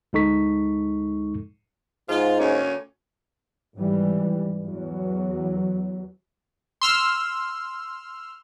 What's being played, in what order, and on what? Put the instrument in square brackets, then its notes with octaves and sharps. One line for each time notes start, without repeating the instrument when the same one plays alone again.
[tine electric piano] D2 G#3 D#4 A4 C#6 B6
[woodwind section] G#2 [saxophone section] F4
[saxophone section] D2 A#3 C#4
[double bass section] G#1 E3 G3
E2 F#3
[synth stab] C6 E6 F6